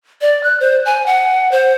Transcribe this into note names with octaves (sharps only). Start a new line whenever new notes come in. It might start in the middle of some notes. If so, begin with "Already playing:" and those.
D5
F#6
C5
G#5
F#5
C5